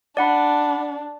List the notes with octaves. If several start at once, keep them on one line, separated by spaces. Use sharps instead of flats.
D4 D5 F#5 B5